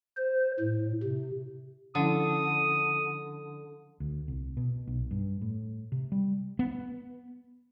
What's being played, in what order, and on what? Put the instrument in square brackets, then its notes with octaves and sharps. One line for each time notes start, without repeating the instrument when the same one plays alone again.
[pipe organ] C5
A2
C3
[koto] D3 [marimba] F3 C#4 E4 [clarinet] D#6
[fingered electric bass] D2
C2
B2
B1
G2
A2
C3
G3
[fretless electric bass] B3